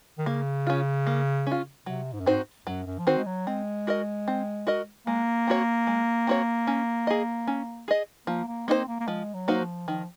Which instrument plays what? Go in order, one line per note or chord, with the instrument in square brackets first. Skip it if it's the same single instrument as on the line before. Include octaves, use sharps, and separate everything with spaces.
[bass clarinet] D#3
[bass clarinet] C#3 [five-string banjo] A#3
[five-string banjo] C#4 F4
A#3
C#4 F4
[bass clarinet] C3 [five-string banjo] F#3
[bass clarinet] G#2
F#2
[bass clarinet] G#2 [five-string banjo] C4 D#4 F#4 C5
[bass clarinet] F#2 [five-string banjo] F#3
[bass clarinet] F#2
F3
[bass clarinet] D#3 [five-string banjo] C4 D#4 F#4 C5
[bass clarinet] G#3
F#3
[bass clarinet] G#3 [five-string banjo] C4
[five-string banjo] F#4 A#4 D#5
C4
F#4 A#4 D#5
[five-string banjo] G#3 [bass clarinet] A#3
[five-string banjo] C4 F#4 C#5
G#3
C4 F#4 C#5
C#4
G#4 D#5
C#4
G#4 D#5
[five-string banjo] F3 [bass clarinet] A#3
[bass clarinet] A#3
[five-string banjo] A#3 D#4 F#4 C5 [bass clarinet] C4
[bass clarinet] A#3
A#3
[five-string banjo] F3 [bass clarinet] G#3
[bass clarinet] F#3
[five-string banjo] A#3 D#4 F#4 C5
[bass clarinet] F3
[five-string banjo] D#3 [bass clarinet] F3